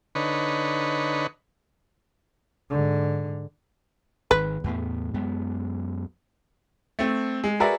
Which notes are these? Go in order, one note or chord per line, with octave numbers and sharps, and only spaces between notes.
D3 D#4 B4 C#5
G#2 D3
G#1 D#3 B4
E2 A2 B3
F#2 G#3 B3
A3 C4
G#3
F#4 G#4 A#4 B4 D5 E5